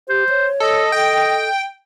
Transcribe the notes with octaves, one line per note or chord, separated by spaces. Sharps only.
G4 C5
C#5
A4 D#5
A4 G5